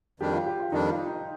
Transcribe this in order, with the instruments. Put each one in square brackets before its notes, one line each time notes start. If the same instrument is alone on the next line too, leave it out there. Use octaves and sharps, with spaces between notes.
[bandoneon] F2 D#3 G3 D4 [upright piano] G4
[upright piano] F4
G4
F4
[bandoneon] F2 D#3 G3 D4 [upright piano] D#4
[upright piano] F4
D#4